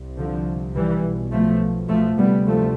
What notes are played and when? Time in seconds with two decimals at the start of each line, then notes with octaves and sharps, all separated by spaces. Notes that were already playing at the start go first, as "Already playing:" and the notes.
Already playing: C2 C3
0.18 D3 F3
0.75 E3 G3
1.03 B1 B2
1.31 F3 A3
1.88 F3 A3
2.17 D2 C3 G3 B3
2.46 F3 A3